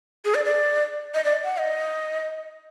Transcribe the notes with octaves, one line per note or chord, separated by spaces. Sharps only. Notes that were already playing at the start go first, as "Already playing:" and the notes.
G#4
D5
D5
D#5
D5
F#5
D#5